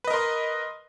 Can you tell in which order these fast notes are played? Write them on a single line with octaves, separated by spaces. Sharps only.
B4 D#5 A#4 C6